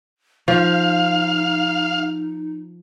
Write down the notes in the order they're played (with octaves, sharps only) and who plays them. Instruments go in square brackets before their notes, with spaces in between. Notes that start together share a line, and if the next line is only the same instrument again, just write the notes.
[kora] F3 [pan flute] D#4 [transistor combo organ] F5